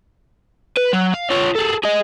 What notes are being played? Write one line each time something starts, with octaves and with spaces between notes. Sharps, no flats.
B4
F#3
F5
F4 C#5
G#4 A4
G#4 D#5